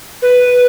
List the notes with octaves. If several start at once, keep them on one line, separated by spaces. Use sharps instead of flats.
B4